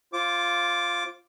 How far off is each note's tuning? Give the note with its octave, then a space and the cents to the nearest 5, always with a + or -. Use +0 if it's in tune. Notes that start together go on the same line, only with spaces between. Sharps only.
F4 +0 C5 +25 D6 -5